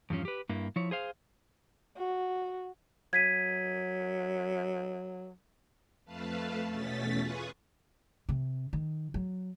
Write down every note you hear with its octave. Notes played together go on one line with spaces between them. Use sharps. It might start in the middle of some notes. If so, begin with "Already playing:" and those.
E2 G2 F3 C#4
G4 B4
G2 A#3 E4
F3 E4 C#5
G#4 C5 F5
F#4
F#3 G#6 B6 D#7
F2 A3 B4 F5 A5
E2 B2 A3 C#4 A6 B6
F4 G#4 B4 G#5 C#6 D#6
C3
D#3
F#3